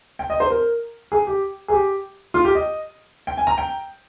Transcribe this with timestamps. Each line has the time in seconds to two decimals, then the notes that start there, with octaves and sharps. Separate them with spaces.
0.19 G5
0.30 D#5
0.40 C5
0.50 A#4
1.12 G#4
1.27 G4
1.68 G#4
1.73 G4
2.34 F4
2.44 G4
2.55 D#5
3.27 G5
3.37 G#5
3.47 A#5
3.58 G5